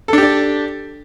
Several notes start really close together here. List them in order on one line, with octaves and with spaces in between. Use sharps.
A4 D4 G4 D5